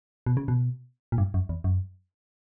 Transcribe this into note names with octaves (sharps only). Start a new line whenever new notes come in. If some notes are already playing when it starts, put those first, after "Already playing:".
B2
C#3
B2
A#2
G2
F#2
E2
F#2